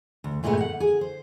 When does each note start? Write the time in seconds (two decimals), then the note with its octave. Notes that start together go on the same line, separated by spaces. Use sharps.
0.24 D2
0.43 G2 A#2 G#3 A3 B3
0.57 F#5 G5
0.80 G#4
1.01 C5